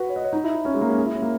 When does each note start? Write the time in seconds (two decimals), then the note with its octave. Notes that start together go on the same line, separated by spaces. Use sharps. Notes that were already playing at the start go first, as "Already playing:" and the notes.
Already playing: F#4 B4
0.09 C#5
0.16 D#5
0.24 C#5
0.33 D#4
0.44 E4
0.54 E4
0.65 C#4
0.74 G#3
0.81 A#3
0.90 C#4
0.98 G#4
1.06 E4
1.15 C#4
1.22 A#3